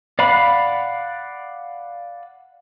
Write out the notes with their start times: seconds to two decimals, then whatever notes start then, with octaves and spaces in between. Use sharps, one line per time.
0.19 D5 F5 F#5 B5